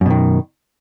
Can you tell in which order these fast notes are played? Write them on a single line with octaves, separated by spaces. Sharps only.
F#2 B2 D#3